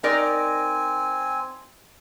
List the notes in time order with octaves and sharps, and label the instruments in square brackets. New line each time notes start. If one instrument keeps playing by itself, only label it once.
[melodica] C4 G#5 [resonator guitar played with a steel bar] D#4 A#4 D5